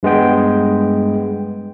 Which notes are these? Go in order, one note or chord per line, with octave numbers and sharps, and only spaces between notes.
G2 G#3 B3 G5